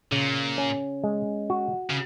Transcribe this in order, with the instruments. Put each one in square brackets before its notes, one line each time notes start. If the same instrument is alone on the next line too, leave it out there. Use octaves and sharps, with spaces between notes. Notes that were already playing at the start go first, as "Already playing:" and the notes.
[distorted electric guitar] A#2 [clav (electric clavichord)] C#3
[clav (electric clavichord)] C#4
G#3
F#4
[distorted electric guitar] C#3